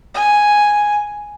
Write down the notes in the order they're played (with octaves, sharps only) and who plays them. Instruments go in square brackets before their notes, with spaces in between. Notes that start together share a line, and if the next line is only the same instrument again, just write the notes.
[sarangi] G#5